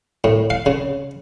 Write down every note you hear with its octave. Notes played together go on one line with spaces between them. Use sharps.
A2
F5
C#3